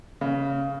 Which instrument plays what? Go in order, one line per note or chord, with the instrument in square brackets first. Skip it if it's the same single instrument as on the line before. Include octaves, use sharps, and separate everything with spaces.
[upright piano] C#3